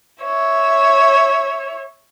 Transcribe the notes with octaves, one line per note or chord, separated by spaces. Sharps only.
C#5 E5